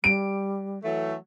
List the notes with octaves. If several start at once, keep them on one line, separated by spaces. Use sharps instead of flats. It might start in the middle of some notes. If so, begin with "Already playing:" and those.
G3 D7
E3 F#3 A3